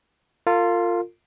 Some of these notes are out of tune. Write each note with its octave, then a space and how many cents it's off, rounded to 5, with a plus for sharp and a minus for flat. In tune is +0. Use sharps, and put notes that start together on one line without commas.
F4 +0 A#4 -45